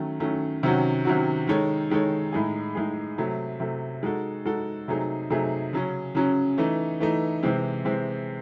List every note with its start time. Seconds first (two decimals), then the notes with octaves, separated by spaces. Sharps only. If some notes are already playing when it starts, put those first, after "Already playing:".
Already playing: D#3 F#3 A3 C#4
0.20 D#3 F#3 A3 C#4
0.63 C3 D#3 F#3 C#4 F#4
1.05 C3 D#3 F#3 C#4 F#4
1.47 D#3 G#3 D#4 A4 C#5
1.90 D#3 G#3 D#4 A4 C#5
2.32 A2 G#3 D#4 G#4
2.75 A2 G#3 D#4 G#4
3.18 C3 F#3 A3
3.60 C3 F#3 A3
4.03 G#3 D#4 F#4 A4
4.45 G#3 D#4 F#4 A4
4.88 C3 F#3 A3 D#4 G#4
5.30 C3 F#3 A3 D#4 G#4
5.73 C#3 F#3 C#4
6.15 C#3 F#3 C#4
6.58 E3 A3 D#4
7.00 E3 A3 D#4
7.43 C3 E3 G#3 C4
7.85 C3 E3 G#3 C4